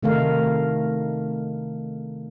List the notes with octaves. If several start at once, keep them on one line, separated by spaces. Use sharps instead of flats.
C3 D#3 A3 D#4 A#4 F5